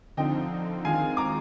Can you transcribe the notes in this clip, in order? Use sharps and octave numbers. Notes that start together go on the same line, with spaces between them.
D3 F3 C4 D#4 D#5 G5
D#3 G#3 C4 F4 F5 G#5
A#5 D6